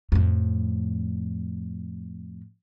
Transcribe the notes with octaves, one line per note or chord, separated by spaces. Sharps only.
F2 A2